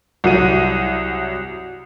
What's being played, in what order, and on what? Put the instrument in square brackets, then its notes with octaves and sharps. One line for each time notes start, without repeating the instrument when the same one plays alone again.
[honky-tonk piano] C2 F#3 D#7